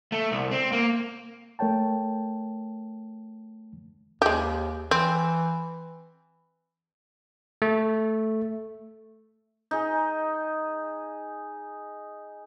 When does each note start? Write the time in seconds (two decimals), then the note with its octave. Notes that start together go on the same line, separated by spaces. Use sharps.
0.12 A3
0.32 C2
0.51 C4
0.72 A#3
1.59 A3 A#4 C#5 G5 A5
4.22 D#2 G#3 G4
4.91 E3 C4
7.62 A3
9.71 D#4 G#4